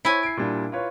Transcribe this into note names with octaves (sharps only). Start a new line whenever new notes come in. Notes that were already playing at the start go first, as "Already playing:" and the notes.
E4 C5 C#5 G#5
C7 D7
A#2 G3 D4
F4 B4 C#5